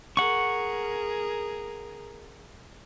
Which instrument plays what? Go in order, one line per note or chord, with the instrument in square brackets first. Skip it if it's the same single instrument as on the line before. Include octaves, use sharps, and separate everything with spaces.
[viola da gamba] G#4 A#4 [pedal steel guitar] F#5 C#6